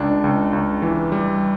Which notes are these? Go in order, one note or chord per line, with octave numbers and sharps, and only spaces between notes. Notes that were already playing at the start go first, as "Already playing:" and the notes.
Already playing: C#2 D4
C#2
C#2
E3
G3